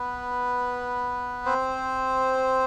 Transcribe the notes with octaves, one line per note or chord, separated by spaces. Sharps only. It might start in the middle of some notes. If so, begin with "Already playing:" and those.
Already playing: B3 B4
C4 C5